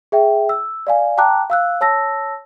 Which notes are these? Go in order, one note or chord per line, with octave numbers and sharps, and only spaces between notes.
G#4 E5 G5
E6
D5 F5 G#5
G5 A5 A#5 D6 F#6
F5 E6 F#6
C#5 A5 E6 A#6